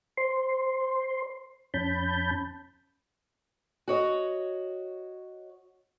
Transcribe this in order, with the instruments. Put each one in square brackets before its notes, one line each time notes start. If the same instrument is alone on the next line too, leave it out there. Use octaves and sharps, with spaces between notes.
[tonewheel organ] C5 C6
F2 C#4 A5 B5 G6
[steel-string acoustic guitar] F#4 C#5 D#5